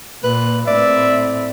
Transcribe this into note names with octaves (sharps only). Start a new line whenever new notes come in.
A#2 B4
A2 C4 D5 E5